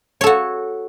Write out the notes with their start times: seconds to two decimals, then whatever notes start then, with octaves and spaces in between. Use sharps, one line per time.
0.21 C#5
0.24 A4
0.26 F#4